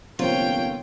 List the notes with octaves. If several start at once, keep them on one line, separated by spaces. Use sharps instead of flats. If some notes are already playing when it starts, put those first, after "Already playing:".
G1 C3 F3 A#3 F4 C#5 G5